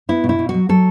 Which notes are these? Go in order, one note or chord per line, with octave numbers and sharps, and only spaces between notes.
B3 E4
B2
E4
B2
F#4
F#3
F#3 A4